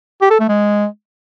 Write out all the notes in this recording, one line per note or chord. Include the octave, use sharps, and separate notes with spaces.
G4
A4
A3
G#3